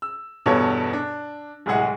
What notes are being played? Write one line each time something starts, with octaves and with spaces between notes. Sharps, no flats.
E6
E2 G2 B2 A4 C#5
D4
D1 C2 G#3 G#4 F#5